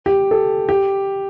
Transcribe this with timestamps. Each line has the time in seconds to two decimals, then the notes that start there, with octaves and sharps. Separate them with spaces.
0.06 G4
0.31 A4
0.69 G4